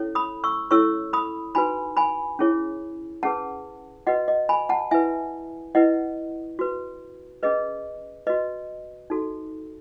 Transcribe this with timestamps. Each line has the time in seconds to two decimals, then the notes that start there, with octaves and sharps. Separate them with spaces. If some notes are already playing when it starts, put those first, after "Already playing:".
Already playing: C#4 E4 A4 C#5
0.15 B5 D#6
0.44 C#6 E6
0.71 C#4 E4 A4 C#5 C#6 E6
1.13 B5 D#6
1.55 D#4 F#4 B4 G#5 B5
1.97 G#5 B5
2.39 C#4 E4 G#4 C#5
3.23 C#4 G#4 B4 F#5 A5
4.07 F#4 B4 D#5 F#5
4.28 D#5
4.49 G#5 B5
4.69 F#5 A5
4.91 E4 B4 E5 G#5
5.75 E4 B4 D#5 F#5
6.59 F#4 B4
7.43 C#4 G#4 B4 D#5
8.27 F#4 B4 D#5
9.10 D#4 F#4 A4